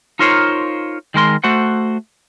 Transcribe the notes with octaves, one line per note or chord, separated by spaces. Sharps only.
D#4 F4 A#4 C5 C#5 F5
D#3 G#3 A#4 C6
A3 F#4 C5 F#5